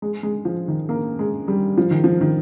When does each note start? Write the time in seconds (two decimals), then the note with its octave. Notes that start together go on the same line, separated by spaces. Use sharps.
0.02 G#3
0.23 G#3
0.45 F3
0.68 D#3
0.89 A#3
1.19 G#3
1.48 G3
1.78 F3
1.91 D#3
2.04 F3
2.21 D#3